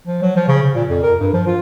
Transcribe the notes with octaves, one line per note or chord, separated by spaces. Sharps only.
F3
F#3
F3
C#3
C#3
A#2
F2
A#4
G2
F3
F4